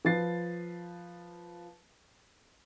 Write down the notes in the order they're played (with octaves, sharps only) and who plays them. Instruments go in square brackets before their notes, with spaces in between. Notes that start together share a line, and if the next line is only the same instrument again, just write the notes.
[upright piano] F3 B4 A6 C7